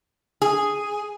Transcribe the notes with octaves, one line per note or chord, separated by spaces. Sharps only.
G#4